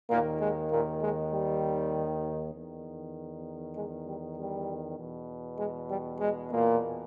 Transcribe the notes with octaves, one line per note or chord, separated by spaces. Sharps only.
D#2 A#2 D#3 A#3
G#3
A#2 A#3
G#3
G3
E2 D#3
G#3
G3
G3
E2 B2
G#3
G3
G#3
A#2 A#3